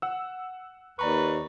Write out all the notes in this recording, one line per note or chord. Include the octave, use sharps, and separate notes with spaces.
F#5 E6
D#2 B4 D5 A#5 C#6